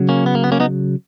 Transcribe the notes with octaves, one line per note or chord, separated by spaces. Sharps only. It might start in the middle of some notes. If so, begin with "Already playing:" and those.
Already playing: C#3 F#3
A#3 C#4
B3
A#3
B3
A#3 C#4
B3 D#4